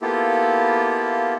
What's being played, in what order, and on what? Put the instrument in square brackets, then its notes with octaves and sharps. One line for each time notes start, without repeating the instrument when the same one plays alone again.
[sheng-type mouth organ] A#3 B3 E4 F4 G4 A4